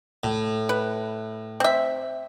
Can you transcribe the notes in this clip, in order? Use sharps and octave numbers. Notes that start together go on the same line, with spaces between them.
A2
B4
C4 E5